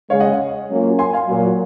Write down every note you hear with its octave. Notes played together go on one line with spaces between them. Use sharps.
C#3 G#3 C#4 C#5 F5
D#5 F#5
F#3 A#3 C#4 F4
G#5 C6
F5 G#5
A#2 F#3 A#3